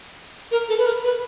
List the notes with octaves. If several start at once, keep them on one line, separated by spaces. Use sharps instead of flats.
A#4
A4
B4
A#4
B4